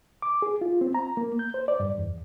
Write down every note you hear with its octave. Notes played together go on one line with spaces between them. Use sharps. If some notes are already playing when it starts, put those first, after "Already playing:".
D6
G#4
F4
C4
A#5
A#3
G6
C5
D5
G2
E2